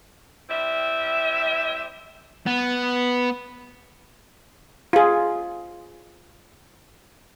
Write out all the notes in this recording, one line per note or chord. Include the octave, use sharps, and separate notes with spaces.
G3 C4 E4 E5
B3
F4 G#4